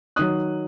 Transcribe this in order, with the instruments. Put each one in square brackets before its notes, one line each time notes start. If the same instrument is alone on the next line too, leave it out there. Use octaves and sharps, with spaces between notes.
[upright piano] D#3 F#3 D#6 F#6